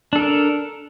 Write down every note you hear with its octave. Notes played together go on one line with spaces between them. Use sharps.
D4 A4 A#4